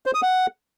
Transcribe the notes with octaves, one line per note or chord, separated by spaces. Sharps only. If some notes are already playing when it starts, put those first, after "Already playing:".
C5
D#6
F#5